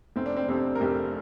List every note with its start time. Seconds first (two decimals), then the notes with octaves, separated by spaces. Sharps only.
0.16 F1 C4
0.26 D4
0.36 C4
0.48 F2 C3 D4
0.75 A#4
0.81 F1 G4